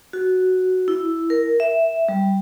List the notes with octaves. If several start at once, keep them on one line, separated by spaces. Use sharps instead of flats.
F#4
E4
A#4
E5
G3